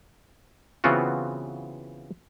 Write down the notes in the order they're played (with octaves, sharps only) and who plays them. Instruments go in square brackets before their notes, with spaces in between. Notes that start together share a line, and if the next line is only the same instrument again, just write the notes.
[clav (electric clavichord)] C#3 E3 B3 C4 F4 F#4